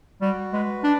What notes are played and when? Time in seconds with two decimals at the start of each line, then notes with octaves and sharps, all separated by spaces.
0.21 G3 F#4
0.53 G#3 B4
0.84 D4 D5